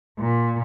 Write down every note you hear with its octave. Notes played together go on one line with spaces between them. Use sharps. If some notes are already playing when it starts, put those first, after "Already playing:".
A#2